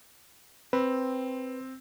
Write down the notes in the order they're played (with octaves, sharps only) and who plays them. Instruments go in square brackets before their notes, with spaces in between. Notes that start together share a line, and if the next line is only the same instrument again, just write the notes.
[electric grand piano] C4 [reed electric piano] B4